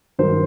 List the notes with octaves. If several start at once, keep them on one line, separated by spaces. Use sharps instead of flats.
G2 D#3 F#3 A#4 C5